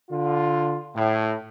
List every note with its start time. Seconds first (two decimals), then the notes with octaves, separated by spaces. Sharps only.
0.11 D3 F4
0.95 A2